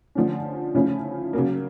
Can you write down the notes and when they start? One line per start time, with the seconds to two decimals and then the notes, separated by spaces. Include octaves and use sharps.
0.15 D3 F3 A3 C#4
0.74 C#3 F3 A3 C#4 E4
1.33 C#3 F#3 A#3